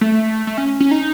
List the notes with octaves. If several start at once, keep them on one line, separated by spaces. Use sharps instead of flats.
A3
A3
C#4
C#4
D#4